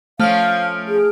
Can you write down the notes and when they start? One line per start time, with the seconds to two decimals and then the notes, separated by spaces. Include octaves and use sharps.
0.19 F3 A3 C#4 F5 F6 D7
0.88 G#4